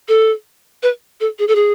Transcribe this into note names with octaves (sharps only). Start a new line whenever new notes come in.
A4
B4
A4
G#4
A4
G#4